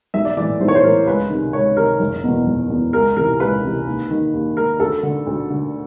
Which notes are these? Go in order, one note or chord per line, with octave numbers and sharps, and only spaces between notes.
B1 E5
D5
A2 E3 D5
B1 C5
C#5
C5
A2 E3 A#4
C#2 B4
C3 D#3
C#2 C#5
C3 D#3 A#4
F#1
E2 B2
F#1
E2 B2
C#2 A#4
C3 E3 A#4
C#2 B4
C3 E3
D#2
D#3
D#2
D#3 A#4
D2 A4
D3
D2
D3